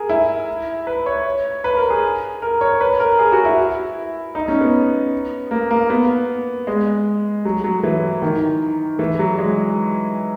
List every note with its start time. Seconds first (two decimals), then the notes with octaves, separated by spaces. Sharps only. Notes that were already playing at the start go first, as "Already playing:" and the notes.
Already playing: G#4 A#4
0.09 E4
0.87 B4
1.06 C#5
1.64 B4
1.77 A#4
1.90 G#4
2.42 A#4
2.61 C#5
2.81 B4
3.00 A#4
3.19 G#4
3.32 F#4
3.45 E4
4.35 D#4
4.48 C#4
4.61 B3
5.51 A#3
5.71 A#3
5.90 B3
6.67 G#3
7.45 F#3
7.64 F#3
7.83 E3
8.22 D#3
8.99 E3
9.19 F#3
9.38 G#3